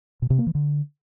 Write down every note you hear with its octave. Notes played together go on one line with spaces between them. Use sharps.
B2
C3
A#3
E3
D3